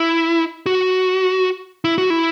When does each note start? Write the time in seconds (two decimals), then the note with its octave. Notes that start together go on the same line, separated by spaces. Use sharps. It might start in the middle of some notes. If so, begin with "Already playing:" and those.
Already playing: E4
0.66 F#4
1.85 E4
1.98 F#4
2.10 E4